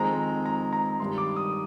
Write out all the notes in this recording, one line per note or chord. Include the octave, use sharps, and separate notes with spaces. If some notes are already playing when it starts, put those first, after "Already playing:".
Already playing: F2 D#3 G#3 C4 A#5
A#5
A#5
G2 D#3 G3 C6
D6
D#6